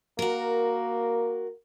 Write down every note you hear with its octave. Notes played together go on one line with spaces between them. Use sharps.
A#3 F#4 A#4